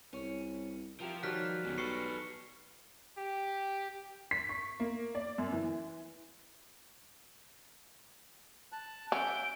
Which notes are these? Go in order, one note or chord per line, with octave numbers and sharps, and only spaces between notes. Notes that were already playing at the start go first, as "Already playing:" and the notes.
C2 C#4
F3 E4 G4 A#4
D#3 F#3 G3 F6 F#6 B6
B1 G#2 C#3
A4 B4 C#6 C7 C#7
G4
B6
C#6
A#3
D5
F#2
E3
A5 F#6
C#4 E5 F#5 G6 D7